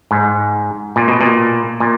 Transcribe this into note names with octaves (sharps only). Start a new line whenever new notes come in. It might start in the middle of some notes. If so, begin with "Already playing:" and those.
G#2
A#2
B2
A#2
A#2